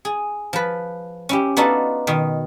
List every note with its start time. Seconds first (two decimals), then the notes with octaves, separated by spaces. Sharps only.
0.05 G#4
0.53 F3 B4
1.29 C#4 E4 G4
1.57 B3 D4 D#4 F4 F#4 A4
2.07 B2 D#3